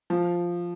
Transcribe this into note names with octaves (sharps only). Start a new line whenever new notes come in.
F3